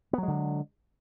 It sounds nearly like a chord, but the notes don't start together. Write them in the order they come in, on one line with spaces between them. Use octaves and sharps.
B3 F#3 G#3 D3